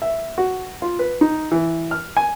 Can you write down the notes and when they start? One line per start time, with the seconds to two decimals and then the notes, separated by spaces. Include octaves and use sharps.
0.02 E5
0.38 F#4
0.82 F4
0.99 B4
1.21 D#4
1.51 E3
1.91 F6
2.17 G#5